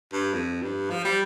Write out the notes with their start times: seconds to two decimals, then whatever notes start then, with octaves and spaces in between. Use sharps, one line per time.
0.13 G2
0.33 F2
0.62 G2
0.90 F3
1.04 G3